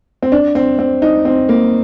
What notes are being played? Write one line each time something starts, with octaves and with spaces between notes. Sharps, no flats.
C4
D4
C4
C4
D#4
C4
A#3